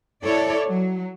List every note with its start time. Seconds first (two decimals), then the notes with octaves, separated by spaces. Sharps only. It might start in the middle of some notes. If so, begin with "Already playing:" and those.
0.24 E4 A4 C#5 D5
0.68 F#3